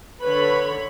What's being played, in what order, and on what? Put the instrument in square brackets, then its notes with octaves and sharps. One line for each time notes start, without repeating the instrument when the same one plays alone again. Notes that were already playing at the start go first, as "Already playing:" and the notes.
[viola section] D3 C#5 B5 [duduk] B4